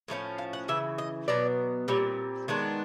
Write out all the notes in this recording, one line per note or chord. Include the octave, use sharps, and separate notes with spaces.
A2 F3 A3 C#4
F5
F#5
C#3 E3 E5
D#5
B2 F#3 B3 D5
A#2 G3 C4 C#5
D#3 G#3 B3 D4 C#5